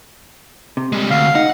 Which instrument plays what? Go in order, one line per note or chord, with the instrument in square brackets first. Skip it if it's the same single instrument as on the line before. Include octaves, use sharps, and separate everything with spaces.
[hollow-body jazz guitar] C3
[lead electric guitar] G3 G#3
[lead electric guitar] D2 [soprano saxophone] F5
[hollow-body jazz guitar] D#4 [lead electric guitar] F#5